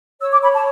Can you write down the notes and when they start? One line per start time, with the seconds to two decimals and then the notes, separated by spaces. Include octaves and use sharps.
0.21 C#5 E6
0.31 D6
0.42 C#5 B5
0.54 A5